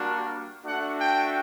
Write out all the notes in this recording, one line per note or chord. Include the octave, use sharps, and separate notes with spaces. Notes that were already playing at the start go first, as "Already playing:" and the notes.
Already playing: G3 A#3 D4 F#4
A3 D4 F#4 F#5
G5